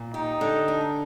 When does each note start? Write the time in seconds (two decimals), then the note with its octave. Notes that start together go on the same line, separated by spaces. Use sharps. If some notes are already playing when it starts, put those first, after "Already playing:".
Already playing: A#2
0.14 D#4 G4
0.41 D3
0.68 D4